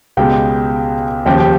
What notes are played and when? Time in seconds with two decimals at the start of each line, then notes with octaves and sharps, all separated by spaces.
0.17 C#2 B2 G#3 G4 G5
1.26 D#2 C#3 F3 G4 G5
1.39 G4 G5